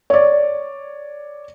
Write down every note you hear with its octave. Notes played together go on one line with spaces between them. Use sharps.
C#5 D5